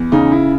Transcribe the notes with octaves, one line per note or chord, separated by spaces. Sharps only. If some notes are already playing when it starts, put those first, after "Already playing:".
Already playing: E2
C#3 D#4
E4